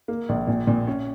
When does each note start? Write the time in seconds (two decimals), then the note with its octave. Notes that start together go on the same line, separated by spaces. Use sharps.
0.08 A#3
0.29 A#1
0.47 A#2
0.67 A#2
0.87 C#4